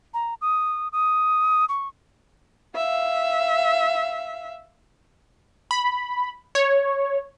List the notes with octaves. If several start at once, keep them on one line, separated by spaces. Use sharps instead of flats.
A#5
D#6
D#6
C#6
E5 F5
B5
C#5